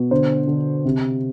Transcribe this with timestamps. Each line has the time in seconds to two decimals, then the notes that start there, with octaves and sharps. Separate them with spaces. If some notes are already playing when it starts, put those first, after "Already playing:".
Already playing: B2
0.11 D3 C5
0.47 D3
0.85 C3